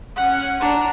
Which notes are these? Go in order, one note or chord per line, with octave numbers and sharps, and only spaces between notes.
C#4 F#5
D4 A#5